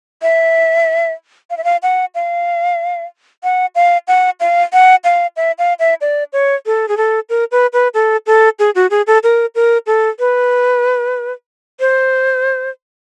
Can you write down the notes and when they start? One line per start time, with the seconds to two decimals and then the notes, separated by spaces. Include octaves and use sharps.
0.22 E5
1.50 F5
1.57 E5
1.64 F5
1.83 F#5
2.15 F5
3.44 F#5
3.75 F5
4.08 F#5
4.40 F5
4.73 F#5
5.04 F5
5.37 E5
5.59 F5
5.79 E5
6.01 D5
6.33 C#5
6.66 A4
6.88 G#4
6.97 A4
7.29 A#4
7.52 B4
7.73 B4
7.94 A4
8.27 A4
8.59 G#4
8.75 F#4
8.91 G#4
9.07 A4
9.23 A#4
9.55 A#4
9.87 A4
10.19 B4
11.80 C5